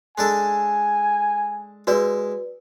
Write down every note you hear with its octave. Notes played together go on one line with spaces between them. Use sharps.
G#3 D4 A4 G#5
G#3 E4 F#4 B4 D5